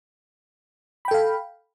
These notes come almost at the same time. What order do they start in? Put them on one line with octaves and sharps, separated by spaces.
B5 G5 A4 F5